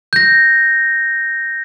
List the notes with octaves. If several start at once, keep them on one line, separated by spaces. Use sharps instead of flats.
G6 A#6